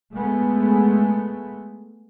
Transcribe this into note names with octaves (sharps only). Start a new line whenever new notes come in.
G#3 A3 B3